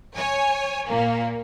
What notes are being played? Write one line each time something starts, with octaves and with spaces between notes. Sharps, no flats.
C#5 G#5
A#2 A#3